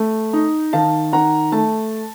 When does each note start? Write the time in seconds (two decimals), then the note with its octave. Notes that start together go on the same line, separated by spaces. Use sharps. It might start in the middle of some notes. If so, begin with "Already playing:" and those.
Already playing: A3
0.33 D#4
0.73 D#3 F5 A5
1.13 D#3 F#5 A#5
1.52 A3 A5